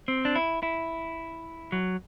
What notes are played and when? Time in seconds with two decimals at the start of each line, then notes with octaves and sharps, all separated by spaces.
0.08 C4
0.25 D4
0.36 E4
0.63 E4
1.72 F#3